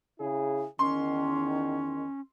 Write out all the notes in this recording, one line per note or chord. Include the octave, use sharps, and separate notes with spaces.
C#3 E4 G#4
E2 D#3 C#4 C6